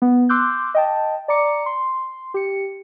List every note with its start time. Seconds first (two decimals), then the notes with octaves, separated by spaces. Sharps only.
0.02 B3
0.29 C6 D6 E6 F#6 G6
0.75 D#5 G5 A5
1.28 D5 A#5 D6 C#7
1.66 C6
2.34 G4 C#7